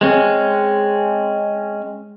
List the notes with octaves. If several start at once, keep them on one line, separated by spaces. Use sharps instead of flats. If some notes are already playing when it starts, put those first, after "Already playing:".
G#3 C4 C#4